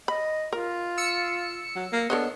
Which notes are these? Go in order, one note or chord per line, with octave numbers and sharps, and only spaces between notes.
D#5 B5
F4 A#4
E6 C#7
F#3
A#3
B3 D4 A4 C#5 D#5